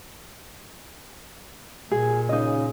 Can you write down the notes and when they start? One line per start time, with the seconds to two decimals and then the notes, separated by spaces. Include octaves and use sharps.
1.91 A#2 G#4
2.29 C#3 D#4 D#5